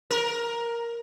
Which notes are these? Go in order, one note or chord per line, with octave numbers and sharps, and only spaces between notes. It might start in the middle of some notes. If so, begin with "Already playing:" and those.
A#4